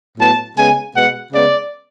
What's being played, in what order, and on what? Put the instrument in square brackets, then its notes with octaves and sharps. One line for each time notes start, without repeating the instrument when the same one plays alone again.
[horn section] A2 F#3 B3 A5
C#3 G#3 B3 G#5
B2 G#3 B3 F#5
C#3 G#3 B3 D5